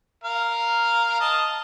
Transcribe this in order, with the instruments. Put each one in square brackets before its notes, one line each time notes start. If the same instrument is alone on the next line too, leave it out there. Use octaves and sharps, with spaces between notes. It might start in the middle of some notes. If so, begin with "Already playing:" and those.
[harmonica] A#4 F5
D#5 A5